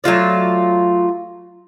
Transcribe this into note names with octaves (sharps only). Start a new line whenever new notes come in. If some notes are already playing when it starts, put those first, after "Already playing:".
F#3 A3 F4 D5